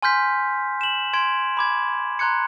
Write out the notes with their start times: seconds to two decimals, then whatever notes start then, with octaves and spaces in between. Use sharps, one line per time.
0.02 G#5 C6 F6 G6 B6
0.81 E7 F#7
1.14 C6 G#6 D7
1.57 B5 D6 G#6
2.19 A#5 C6 F#6 G#6 C#7